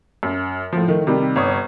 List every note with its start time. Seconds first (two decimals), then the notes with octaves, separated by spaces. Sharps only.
0.23 F#2
0.73 A2 F3
0.88 D#3 A3
1.07 C3 D#3 G3
1.36 G1 C#5 D#6